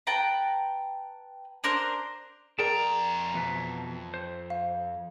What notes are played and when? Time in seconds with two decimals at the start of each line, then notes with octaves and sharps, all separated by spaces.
0.07 B4 G5 A5 A#5
1.64 D4 A#4 C5 F#6
2.59 F2 G#4 A#4 D5 G5 A5 A#5
3.34 E2 B2 B4
4.14 C5
4.50 F5